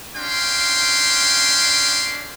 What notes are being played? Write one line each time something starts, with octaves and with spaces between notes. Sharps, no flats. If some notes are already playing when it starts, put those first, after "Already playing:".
C#4 D4 F5 G5 C6